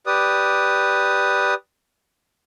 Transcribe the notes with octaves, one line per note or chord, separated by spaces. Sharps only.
G4 B4 D5 D#6